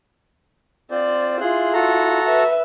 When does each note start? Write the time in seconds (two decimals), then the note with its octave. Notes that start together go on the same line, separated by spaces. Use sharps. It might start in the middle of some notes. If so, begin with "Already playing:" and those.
0.91 C4 F4 C5 D5
1.40 E4 F4 G#4 C6 F#6
1.73 F#4 A4 A#5
2.25 B4 E5